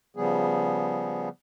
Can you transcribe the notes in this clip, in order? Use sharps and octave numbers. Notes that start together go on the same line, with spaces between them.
C#3 F3 G3 B3 G#4